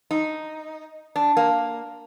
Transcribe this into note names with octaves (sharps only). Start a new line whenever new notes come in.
D#4
D4
A#3